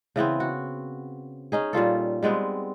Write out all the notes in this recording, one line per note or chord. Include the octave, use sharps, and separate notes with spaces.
C#3 E3 B3 C4
F#4
C#4 D#4 G#4
A#2 G3 F4 A4
G3 G#3 B3 C4